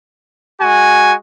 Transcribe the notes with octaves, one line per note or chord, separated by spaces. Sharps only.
G#3 F#4 G#5